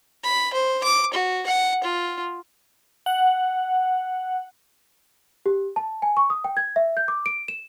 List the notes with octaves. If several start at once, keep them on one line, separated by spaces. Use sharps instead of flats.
B5
C5
D6
F#4
F#5
F4
F#5
G4
A5
G#5
C#6
D#6
G5
G#6
E5
G6
D6
D7
E7